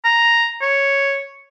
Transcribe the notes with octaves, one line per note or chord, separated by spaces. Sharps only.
A#5
C#5